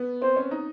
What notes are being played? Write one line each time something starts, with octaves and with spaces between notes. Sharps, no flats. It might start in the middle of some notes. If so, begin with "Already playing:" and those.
Already playing: B3
C4 C5
C#4
D#4